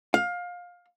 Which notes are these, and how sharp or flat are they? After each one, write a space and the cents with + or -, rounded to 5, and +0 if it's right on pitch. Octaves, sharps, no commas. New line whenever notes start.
F5 +20